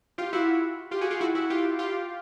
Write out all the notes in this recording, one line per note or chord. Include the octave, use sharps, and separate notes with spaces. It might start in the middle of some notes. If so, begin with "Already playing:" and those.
F4 G4
E4 F#4
F4 G4
F#4 G#4
F4 G4
E4 F#4
E4 F#4
F4 G4
F4 G4